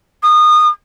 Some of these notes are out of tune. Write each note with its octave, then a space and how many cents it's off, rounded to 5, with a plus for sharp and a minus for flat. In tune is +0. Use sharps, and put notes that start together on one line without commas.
D#6 -25